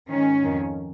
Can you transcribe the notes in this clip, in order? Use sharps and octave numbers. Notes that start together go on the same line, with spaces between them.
G#2 D#3 C#4
F2 D#3